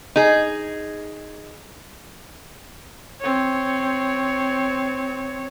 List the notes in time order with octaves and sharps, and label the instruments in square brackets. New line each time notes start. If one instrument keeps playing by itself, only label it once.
[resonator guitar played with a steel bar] D#4 G#4
[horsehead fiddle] C4 C#5